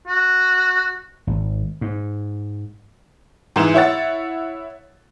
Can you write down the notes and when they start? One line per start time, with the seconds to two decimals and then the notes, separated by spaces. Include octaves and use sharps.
0.07 F#4
1.27 G#1
1.81 G#2
3.56 G#2 E3 E7
3.74 E4 C#5 F#5 A6